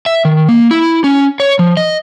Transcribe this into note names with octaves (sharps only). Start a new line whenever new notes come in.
E5
D#3
A#3
E4
C#4
C#5
F3
D#5